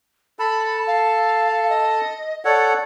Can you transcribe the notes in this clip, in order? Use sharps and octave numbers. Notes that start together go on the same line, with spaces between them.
A4 A5 B5
F5
D#5
A4 C#5 D5 F#5